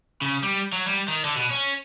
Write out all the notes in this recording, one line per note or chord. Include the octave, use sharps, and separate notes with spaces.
C#3
G3
F#3
G3
D#3
D3
B2
C#4